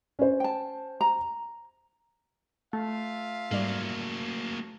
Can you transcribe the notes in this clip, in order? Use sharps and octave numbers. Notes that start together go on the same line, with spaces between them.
C#4 C5
G5 A5
A#5
A3 F4 E5 F5
G#2 F#3 G3 A#3 D5